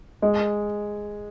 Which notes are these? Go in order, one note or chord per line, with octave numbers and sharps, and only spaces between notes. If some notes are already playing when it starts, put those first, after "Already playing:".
G#3